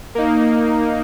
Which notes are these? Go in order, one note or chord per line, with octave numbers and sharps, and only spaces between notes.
A#3 D#4